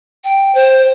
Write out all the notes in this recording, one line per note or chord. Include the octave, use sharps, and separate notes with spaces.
G5
C5